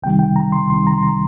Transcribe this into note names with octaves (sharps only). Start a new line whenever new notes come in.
C2 C3 D#3 G3 G5
G5
A#5
C6
C2 C3 D#3 G3 C6
A#5
C6
A#5